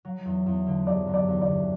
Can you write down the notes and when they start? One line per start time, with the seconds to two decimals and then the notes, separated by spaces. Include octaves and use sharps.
0.05 F#3
0.26 E2
0.46 E2
0.67 D3
0.87 F#3 D5
1.07 E2
1.14 D5
1.28 E2
1.41 D5
1.48 D3